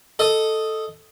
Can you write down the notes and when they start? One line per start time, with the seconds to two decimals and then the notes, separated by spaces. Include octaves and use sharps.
0.19 A4 D#5 D#6